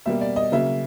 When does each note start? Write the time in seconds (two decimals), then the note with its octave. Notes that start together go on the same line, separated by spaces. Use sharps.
0.06 B2 G3 A#3 E5
0.21 D5
0.36 D#5
0.52 C#3 F#3 A#3 E5